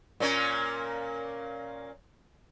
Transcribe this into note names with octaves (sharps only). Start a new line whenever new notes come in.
A#2 A#3 C#4